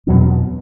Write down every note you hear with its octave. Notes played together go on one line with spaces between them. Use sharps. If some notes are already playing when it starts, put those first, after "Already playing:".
E2 B2 F#3 C4